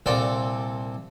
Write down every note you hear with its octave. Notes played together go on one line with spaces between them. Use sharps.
C2 A#2 C4 A4 D5 G5